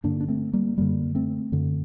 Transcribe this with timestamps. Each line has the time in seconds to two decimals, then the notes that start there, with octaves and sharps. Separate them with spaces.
0.04 G2 D3 A#3 D4
0.21 D4
0.28 A3 C4
0.53 G3 A#3
0.78 F#2 D3 G3 A#3
1.15 A3 C4
1.52 F#2 D3